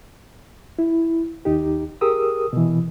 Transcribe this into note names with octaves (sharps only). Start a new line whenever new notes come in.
E4
D#2 D#4 G4
G4 G#4 A#4 D#6 E6
B2 E3